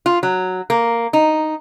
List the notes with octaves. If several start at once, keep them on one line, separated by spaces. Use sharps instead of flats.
F4
F#3
A#3
D#4